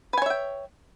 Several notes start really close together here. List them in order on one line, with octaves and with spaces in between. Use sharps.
B4 G#5 C#5 E5 G5